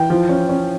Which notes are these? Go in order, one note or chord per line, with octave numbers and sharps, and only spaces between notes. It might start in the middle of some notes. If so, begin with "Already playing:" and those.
Already playing: E3 G5
F3
C#4
C#4